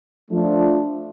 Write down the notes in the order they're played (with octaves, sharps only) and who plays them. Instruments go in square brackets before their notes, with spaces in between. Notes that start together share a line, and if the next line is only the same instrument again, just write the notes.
[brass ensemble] F3 A3 D4